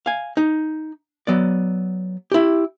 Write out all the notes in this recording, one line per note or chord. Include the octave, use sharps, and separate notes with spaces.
F5 G#5
D#4
F#3 B3 D5
E4 G4